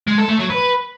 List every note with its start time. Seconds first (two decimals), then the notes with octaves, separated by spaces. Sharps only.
0.07 G#3
0.18 A4
0.29 A3
0.39 F#3
0.50 B4